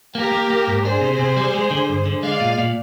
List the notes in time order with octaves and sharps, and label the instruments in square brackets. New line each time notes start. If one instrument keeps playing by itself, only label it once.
[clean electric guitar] A#3 [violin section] G4 A#4
[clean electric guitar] A#3
A#3
G#2
[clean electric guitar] D4 [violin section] G#4 C5
[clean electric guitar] C3
C3
G3
G#3
D3
G2
D3
[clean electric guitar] G#3 [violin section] D5 F5
[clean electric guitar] A#2
A#2